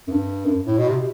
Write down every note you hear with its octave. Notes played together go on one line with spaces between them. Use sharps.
F#2
G2
F#2
A2
B2
C3